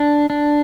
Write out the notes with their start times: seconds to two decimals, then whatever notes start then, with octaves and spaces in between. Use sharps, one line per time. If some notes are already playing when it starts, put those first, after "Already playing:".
Already playing: D4
0.30 D4